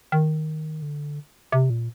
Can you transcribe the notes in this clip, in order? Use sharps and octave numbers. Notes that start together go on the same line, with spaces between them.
D#3
D3
C3
A#2